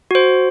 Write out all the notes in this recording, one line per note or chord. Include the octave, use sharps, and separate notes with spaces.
F#4 C5